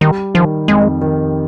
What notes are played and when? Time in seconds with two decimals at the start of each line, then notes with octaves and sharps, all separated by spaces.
0.01 D#3 G3
0.34 D#3 F3
0.68 F2 G#3
1.01 D#3